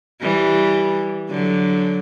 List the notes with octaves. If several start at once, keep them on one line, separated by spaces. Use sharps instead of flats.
E3 G3
D3 F#3